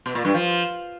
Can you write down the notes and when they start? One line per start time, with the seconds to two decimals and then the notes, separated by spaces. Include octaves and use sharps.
0.06 B2
0.15 A#2
0.25 G2
0.34 F3